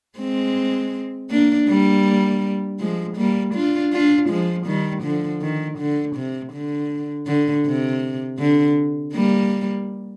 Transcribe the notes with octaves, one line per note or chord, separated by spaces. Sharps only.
G#3 C4
A#3 D4
G3 A#3
F3 G#3
G3 A#3
D4 F4
D4 F4
F3 G#3
D#3 G3
D3 F3
D#3
D3
C3
D3
D3
C3
D3
G3 A#3